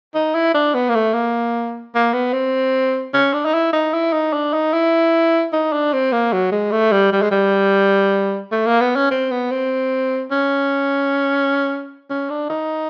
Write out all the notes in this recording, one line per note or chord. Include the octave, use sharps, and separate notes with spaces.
D#4
E4
D4
B3
A#3
A3
A#3
A#3
B3
C4
C#4
D4
D#4
E4
D#4
E4
D#4
D4
D#4
E4
D#4
D4
C4
A#3
F#3
G#3
A3
G3
G3
G#3
G3
A3
A#3
B3
C#4
C4
B3
C4
C#4
C#4
D4
D#4